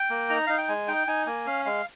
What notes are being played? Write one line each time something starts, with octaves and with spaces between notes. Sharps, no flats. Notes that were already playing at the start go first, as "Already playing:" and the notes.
Already playing: G5
A#3
D#4 A#5
D#4 F5
G5
G#3 G#5
D#4 G5
D#4 G#5
A#3 G#5
C#4 F5
G#3 F5